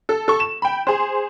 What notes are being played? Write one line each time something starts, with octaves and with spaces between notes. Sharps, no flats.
A4
A4 C#6
E7
G5 B5
G#4 C5